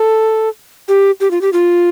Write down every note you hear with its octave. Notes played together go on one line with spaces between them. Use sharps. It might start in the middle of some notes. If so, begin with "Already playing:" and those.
Already playing: A4
G4
G4
F4
G4
F4